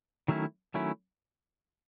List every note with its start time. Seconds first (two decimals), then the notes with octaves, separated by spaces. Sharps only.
0.28 D#3 F#3 A3 C#4 E4
0.74 D#3 F#3 A3 C#4 E4